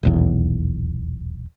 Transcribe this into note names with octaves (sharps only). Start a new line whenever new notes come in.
D#1 B1 E2